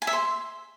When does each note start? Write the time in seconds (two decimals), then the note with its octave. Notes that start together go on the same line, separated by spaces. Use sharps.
0.02 G#5
0.07 E5
0.13 C6